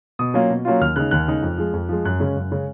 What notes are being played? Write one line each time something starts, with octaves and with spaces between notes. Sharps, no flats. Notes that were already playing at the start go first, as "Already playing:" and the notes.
B2 D#6
F#3 A#3 C#4 F4
B2
F#3 A#3 C#4 F4
D#2 F6
C#3 G#3 D#4 F#6
D#2 F#6
C#3 G#3 D#4
F2
F3 G#3
F2
F3 G#3
F#2 F#6
C#3 G#3 C#4
F#2
C#3 G#3 C#4